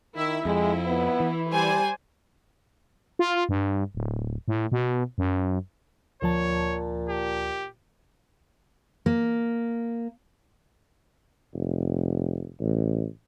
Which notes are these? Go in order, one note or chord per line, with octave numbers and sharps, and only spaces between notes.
D#3 E4 E5
F2 G#3 E4
B3
E3
G3 C5 D5 G#5
F4
G2
D1
A2
B2
F#2
D2 A#2 F3 C#5 A5
G4
A#3
F1
A1